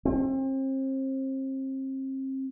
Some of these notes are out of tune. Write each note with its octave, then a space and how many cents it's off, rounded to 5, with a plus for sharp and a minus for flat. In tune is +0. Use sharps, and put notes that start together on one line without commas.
C4 +35